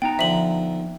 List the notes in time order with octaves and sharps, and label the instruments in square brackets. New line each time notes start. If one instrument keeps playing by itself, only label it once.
[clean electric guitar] B3 D#4 A#5 [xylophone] G5
[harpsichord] D3 F3 [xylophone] E5 F#7